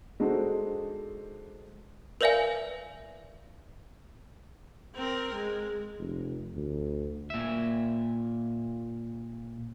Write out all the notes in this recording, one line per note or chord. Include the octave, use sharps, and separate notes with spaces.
G#3 D4 D#4 F#4 A4 C5
A#4 B4 D5 E5 F5 G#5
C4 A#4
G#3
F1
D2
A#2 E5